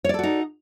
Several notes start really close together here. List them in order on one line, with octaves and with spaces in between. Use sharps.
C#5 D5 A4 F#4 D#4